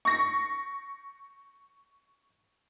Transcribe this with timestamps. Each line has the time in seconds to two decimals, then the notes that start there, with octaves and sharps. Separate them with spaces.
0.05 C#6 A#6